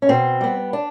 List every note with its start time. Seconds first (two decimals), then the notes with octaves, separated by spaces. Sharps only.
0.02 C#4
0.09 B2 C4
0.41 G3 B3
0.73 D4